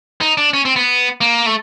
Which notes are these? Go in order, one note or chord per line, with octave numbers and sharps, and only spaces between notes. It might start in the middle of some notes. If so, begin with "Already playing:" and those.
D#4
D4
C#4
C4
B3
A#3
A3